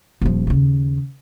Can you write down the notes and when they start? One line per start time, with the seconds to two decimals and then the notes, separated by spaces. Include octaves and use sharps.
0.21 D#1 F3
0.47 D#2 C#3